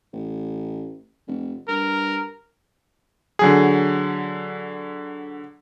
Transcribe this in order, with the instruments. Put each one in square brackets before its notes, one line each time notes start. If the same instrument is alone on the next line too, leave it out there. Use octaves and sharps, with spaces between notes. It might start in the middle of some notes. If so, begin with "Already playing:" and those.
[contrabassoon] A1
F1
[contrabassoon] G2 [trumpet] A#4
[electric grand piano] D3 F#3 G#4